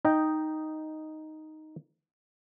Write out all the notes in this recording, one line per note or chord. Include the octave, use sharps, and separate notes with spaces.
D#4 D#5 G5